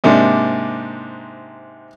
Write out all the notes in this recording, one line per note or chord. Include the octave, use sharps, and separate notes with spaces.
G#2 C3 A#3 D4